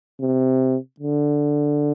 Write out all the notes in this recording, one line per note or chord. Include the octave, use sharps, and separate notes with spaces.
C3
D3